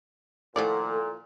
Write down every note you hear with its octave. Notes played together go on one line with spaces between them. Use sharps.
A#2 D#3 F3 A3 E4 A4 D5 F#5